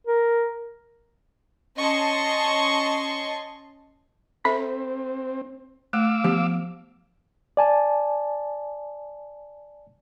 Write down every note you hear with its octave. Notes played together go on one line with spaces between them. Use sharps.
A#4
C#4 D#5 A5 C6 C#6
C4 A4 E5 B5
A3 F5 D6 E6
F3 B3 G4
D5 G#5 A5